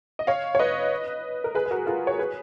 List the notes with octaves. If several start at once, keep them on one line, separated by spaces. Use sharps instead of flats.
D#5
C#5 F5
C#5
B4 D#5
A#4
G#4 B4
B4
F#4 A#4
F4 G#4
C#5
G#4 B4